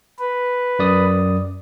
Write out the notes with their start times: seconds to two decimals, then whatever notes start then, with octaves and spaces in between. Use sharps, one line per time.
0.19 B4
0.79 F#2 D5 D#6